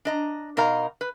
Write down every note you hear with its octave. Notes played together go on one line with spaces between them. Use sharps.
D4 D#5 A#5
B2 D#4 A#4 F5 A#5
B4